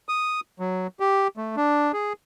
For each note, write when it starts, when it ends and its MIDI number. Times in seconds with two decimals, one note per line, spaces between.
0.09 0.40 87
0.60 0.87 54
1.00 1.28 67
1.37 1.56 57
1.57 1.92 62
1.93 2.13 68